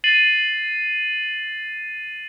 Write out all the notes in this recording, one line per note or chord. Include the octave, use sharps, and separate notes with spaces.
A6 C7 D#7 F#7